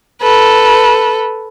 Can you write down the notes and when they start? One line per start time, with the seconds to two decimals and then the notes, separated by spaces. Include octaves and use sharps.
0.21 A4 B4